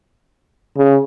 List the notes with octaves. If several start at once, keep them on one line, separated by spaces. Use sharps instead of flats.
C#3